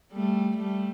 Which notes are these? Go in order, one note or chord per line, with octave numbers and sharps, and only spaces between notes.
G3 A3
G3 A3